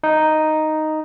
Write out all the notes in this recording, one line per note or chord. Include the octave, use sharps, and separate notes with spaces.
D#4